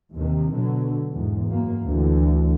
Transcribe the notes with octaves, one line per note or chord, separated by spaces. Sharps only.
D#2 C3 D#3
B2 D3 F#3
E2 G#2
F#2 A#3
D2 D3 E3